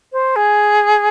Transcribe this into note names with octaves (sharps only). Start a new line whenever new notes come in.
C5
G#4